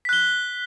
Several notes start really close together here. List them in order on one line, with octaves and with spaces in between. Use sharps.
B6 F#6 G7